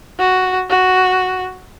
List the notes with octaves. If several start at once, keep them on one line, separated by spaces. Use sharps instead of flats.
F#4
F#4